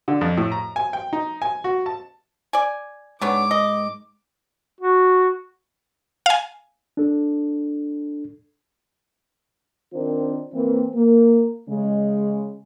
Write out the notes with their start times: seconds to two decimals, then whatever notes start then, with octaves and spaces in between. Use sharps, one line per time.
0.08 D3
0.21 F2
0.37 A2
0.52 A#5
0.76 G#5
0.93 G5
1.13 D#4
1.42 G#5
1.64 F#4
1.86 A5
2.53 D5 G#5
3.21 G#2 D3 B3 C#5 D6
3.51 D#5
4.81 F#4
6.26 F5 G#5
6.97 D4 A4
9.94 D#3 C4 D4 F4 A#4 C5
10.53 E3 A#3 C4
10.94 A#3
11.69 C#3 G#3